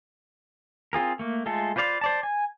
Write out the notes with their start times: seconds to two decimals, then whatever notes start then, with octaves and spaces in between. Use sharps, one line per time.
0.93 C4 F4 G#4 A#4
1.19 A3 A#3
1.46 G#3 A3 F4 A4
1.76 F4 B4 C5 D5 F5
2.01 C5 D5 A5
2.23 G#5